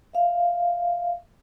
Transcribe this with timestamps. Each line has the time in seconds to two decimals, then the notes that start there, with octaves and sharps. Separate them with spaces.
0.13 E5 F5